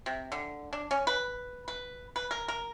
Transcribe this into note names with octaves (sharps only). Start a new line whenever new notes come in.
C3
D3
D4
C#4
B4
B4
B4
A#4
A#4